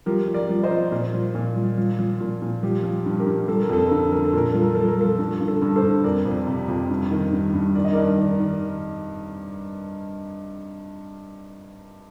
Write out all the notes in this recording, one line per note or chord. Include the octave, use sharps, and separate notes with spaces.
F3 G4 A#4
F3
A#4 D5
F3
C5 D#5
F3
A#2
F3
A#2
F3
F3
F3
A#2
A#2
F3 G4
F3
G2
G4 A#4
G2
F3 A4
A#4
F2 A4
D3 A#4
A4
F3 A#4
A4
A#2 A#4
F3 A4
A#4
F3 A4
A#4
F3 A4
G2
D3
A4
G2
A4 C5
G2
F2 A#4 D5
F2
C3
F2
G2
D#3
G2
G2
D#3 D5
D#5
G2 A#4 D5
D#3
D#3